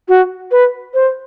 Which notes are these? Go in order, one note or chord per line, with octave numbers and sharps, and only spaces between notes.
F#4
B4
C5